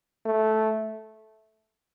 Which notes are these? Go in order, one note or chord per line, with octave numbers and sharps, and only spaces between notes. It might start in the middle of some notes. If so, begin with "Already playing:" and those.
A3